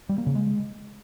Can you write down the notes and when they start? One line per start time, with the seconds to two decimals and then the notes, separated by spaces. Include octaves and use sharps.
0.09 G3
0.18 A#3
0.27 C#3
0.35 G#3